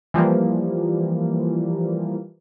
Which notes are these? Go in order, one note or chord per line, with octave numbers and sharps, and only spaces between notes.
E3 F3 G3 A#3